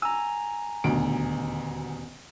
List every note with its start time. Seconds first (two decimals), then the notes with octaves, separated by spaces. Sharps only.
0.02 G#5 A#5 E6
0.84 D#1 D2 B2 D7